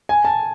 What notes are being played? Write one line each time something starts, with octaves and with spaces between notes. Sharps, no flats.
G#5
A5